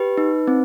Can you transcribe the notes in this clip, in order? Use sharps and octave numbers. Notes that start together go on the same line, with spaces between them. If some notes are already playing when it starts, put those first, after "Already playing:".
Already playing: G4 B4
D#4
C4